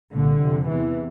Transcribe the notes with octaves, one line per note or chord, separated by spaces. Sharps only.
C2 A#2 D3
F2 C3
E2 C3 E3